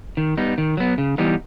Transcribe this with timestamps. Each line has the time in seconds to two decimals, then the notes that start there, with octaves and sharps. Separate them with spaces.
0.17 D#3
0.37 G3 B3 D#4
0.58 D#3
0.77 F#3 B3
0.98 C#3
1.18 E3 G3 B3 D#4